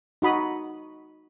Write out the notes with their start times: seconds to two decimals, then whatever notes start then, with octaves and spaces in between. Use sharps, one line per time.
0.22 D#4 F#4 B5 D#6